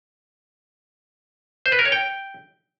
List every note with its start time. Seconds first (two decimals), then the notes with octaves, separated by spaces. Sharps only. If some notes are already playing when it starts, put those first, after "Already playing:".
1.66 C5
1.72 B4
1.79 A#4
1.85 C#5
1.92 G5